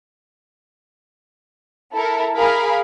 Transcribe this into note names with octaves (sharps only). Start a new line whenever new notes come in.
E4 A4 A#4
G#4 A#4 F5 B5